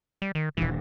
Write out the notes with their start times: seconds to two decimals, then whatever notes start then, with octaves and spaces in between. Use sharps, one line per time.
0.22 G3
0.35 D#3
0.57 D#1 G2 E3